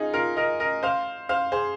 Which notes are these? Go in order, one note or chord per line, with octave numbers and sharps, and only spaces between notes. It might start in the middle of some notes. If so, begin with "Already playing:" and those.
Already playing: D#4 F4 G#4
F4 A#4
A#4 D#5
A#4 D#5
C5 F5
C5 F5
G#4 C5